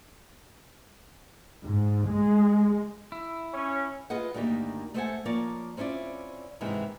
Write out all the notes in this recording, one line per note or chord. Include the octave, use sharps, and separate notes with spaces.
G#2
G#3
E4
C#4
F4 G#4 B4 D#5 F#5
D2 G2 D#3 G3 A#3
A3 A4 C5 D#5 F#5 G#5
F3 A#3 A#4 C#5 D5
C4 C#4 E4 F4 D5
G#2 C3 D#3 E3 G#3 E4